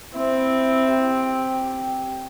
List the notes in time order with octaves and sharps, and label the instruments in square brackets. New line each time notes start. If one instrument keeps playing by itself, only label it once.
[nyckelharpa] C4 [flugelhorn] E4
[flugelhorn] G4